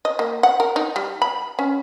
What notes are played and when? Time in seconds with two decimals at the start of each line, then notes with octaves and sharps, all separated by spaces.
0.05 D#5
0.19 A#3
0.43 F#5
0.60 A#4
0.76 D#4
0.96 G3
1.22 B5
1.59 C#4